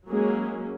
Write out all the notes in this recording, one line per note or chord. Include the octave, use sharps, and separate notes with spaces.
F#3 G#3 A#3 C#4 G#4